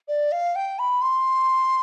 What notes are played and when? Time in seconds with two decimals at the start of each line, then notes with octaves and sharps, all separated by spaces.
0.08 D5
0.32 F5
0.56 G5
0.79 B5
1.02 C6